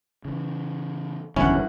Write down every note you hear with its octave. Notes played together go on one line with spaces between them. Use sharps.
C#3 E3
F#1 E2 G2 D3 C#4 E4 F#5